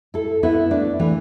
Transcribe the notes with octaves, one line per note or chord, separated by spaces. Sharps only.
E4 A4
B3 E4
A3 D4
E3 A3